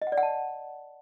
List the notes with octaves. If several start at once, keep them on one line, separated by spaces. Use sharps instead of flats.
D#5
F#5
D5
F#5
A5